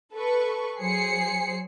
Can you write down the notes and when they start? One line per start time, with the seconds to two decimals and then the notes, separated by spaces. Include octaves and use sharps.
0.14 A4 B4 C#6
0.78 F#3 G#4 C5 C7 C#7